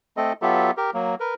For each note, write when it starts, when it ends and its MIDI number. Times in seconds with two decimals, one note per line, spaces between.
0.17 0.33 57
0.17 0.33 60
0.17 0.33 69
0.17 0.33 75
0.42 0.71 54
0.42 0.71 59
0.42 0.71 65
0.42 0.71 67
0.42 0.71 69
0.42 0.71 76
0.77 0.91 67
0.77 0.91 70
0.94 1.15 54
0.94 1.15 58
1.20 1.34 70
1.20 1.34 71